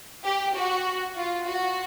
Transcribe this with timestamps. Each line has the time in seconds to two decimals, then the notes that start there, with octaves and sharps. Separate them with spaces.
0.25 G4
0.55 F#4
1.17 F4
1.47 F#4